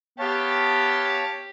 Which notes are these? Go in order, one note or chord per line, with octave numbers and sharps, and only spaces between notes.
B3 G4 C#5 F5 A5